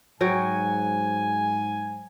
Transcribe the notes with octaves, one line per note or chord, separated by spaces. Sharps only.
G#2 F#3 F#4 G5 G#5